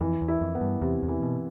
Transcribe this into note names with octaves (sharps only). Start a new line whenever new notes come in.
F2 E3
E2
E4
F2
B3
G2
E2 C3
E2
E3
B2